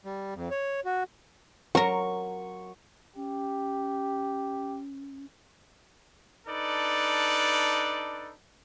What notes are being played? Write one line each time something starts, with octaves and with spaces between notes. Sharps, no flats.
G3
F2
C#5
F#4
F#3 A#4 C#6
C#4 G4
D4 D#4 A4 B4 D5